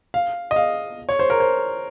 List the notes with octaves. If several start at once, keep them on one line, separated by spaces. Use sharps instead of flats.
F5
D#5
F5
C#5
C5
A#4
C5